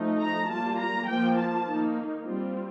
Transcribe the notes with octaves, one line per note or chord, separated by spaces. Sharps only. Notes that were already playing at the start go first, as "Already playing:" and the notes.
Already playing: F3 A3 D#4
A#5
G3 A#3 F4 A5
A#5
F3 A#3 F4 G5
A5
D#3 A#3 D#4
G3 C4 F4